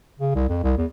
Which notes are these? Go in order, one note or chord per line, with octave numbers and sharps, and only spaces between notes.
C#3
C2
F2
C2
E2